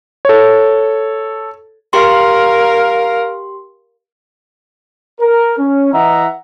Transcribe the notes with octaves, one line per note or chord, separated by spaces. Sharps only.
A4 C#5
G4 A#4 F5 C6
A#4
C#4
E3 E4 D#5 E5 F#5 A#5